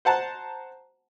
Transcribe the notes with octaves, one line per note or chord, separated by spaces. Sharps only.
C5 F#5 A5 A#5